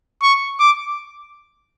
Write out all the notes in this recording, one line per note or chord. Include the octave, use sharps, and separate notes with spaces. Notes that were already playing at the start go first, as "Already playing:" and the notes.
C#6
D6